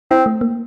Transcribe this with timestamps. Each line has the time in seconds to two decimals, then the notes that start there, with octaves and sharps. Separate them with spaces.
0.11 C4 E4
0.26 A3
0.41 A#3